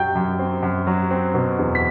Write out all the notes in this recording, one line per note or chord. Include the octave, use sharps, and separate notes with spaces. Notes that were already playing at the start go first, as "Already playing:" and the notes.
Already playing: F#2 F#3 G5 G6
F#2
C4
F#2
F#3
C4
B2
E2
B6